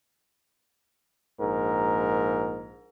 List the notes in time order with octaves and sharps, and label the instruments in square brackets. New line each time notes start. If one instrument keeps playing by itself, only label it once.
[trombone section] A#1 G#2 A#4